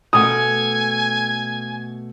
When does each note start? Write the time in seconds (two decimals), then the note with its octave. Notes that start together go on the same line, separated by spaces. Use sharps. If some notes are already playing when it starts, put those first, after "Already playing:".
0.13 B2 A3 G#5 D#6